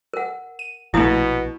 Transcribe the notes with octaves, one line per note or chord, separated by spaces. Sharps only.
A#4 F#5
D#7
A#1 B2 F3 A3 E4 D#6